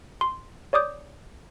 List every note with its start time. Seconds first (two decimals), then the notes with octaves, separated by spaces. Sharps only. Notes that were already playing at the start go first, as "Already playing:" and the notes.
0.21 C6
0.73 C#5 D5 D6 D#6 G6